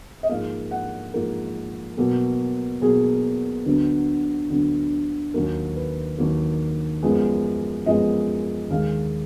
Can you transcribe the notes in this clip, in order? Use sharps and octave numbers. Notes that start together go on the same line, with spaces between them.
D#5
G#2 F3 A#3 F5
F#5
G#2 F3 A#3 A#4
B2 F#3 A#3
B2 F#3 A#3 G#4
D2 D3 F#3 B3
D2 D3 F#3 B3
D#2 D#3 F#3 A#3 A#4
B4
D#2 D#3 F#3 A#3
F#2 F3 G#3 B3
F#2 F3 G#3 B3 D#5
D#2 D#3 G#3 F5